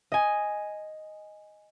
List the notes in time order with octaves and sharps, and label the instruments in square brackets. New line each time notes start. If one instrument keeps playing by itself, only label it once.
[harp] D#5 G#5